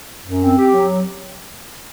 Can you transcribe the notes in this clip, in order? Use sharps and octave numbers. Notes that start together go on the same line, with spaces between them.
F#2
C4
G4
F#3